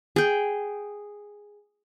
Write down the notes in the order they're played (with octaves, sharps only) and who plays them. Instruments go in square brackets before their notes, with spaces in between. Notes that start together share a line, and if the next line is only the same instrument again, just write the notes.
[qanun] G#4 G5